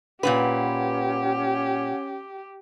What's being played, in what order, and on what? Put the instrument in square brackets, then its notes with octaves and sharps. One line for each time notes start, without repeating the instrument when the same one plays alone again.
[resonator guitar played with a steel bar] A#2 D#3 B4 [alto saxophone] C#4 [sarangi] G4 [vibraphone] F#5